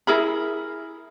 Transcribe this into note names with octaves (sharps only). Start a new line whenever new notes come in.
E4 G#4 A#4 B5